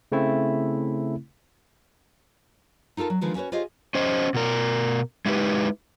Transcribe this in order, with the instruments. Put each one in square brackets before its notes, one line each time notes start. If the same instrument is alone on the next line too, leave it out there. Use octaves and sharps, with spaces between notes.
[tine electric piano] C#3 A3 C4 E4
[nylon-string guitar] D#4 F4 A4 A#4 A5
F#3
D3 D#3 F3 G#3 B4
C#4 F#4 B4 C#5
F4 G4 G#4 C5 C#5 D#5
[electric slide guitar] C#4 C5 D#5
B2 A#4
G#3 D#4 E4 G4 B4